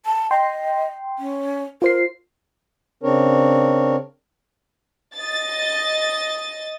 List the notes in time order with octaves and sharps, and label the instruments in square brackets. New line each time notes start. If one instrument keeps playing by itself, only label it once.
[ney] A5
[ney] D#5 [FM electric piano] G5 C6
[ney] C#4
[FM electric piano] F4 C5 C7 [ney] A#4
[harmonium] C#3 C4 D4 A#4 C#5
[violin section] D#5 A6